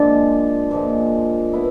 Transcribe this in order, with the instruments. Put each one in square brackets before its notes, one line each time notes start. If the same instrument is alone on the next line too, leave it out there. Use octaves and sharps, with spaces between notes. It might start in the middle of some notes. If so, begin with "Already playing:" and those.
Already playing: [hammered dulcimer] A#2 F3 G#3 [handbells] D4 D5
[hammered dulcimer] A#2 F3 G#3
B3 E4